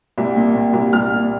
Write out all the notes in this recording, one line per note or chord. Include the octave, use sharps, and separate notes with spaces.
C2
A#2
A#2
C2
C2 F6
A#2